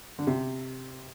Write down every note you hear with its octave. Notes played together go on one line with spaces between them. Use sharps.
D3
C3